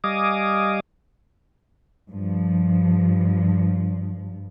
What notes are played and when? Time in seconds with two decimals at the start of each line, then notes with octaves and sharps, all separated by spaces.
0.04 G3 D#5 F5 G#5 D6 D#6
2.10 G2 F3